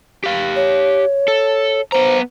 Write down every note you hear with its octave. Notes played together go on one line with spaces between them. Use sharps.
G4 F5
C#5
A4
B3 C5 A#5